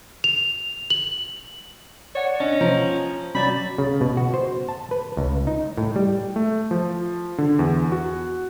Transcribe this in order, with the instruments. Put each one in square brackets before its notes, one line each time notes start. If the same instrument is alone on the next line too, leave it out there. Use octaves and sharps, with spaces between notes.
[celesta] F7
F#7
[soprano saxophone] C#5 [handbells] D5 F#5
[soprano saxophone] C#4 [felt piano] D4 [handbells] D#5
[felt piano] F3 [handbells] C5 A#5
[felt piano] F#3 [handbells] C#4 D5 A6 [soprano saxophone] B5
[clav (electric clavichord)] C#3
B2
F#4
C5
A5
B4
C#2
D#4
A2
G3
[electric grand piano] A3
F3
D3
E2
F#4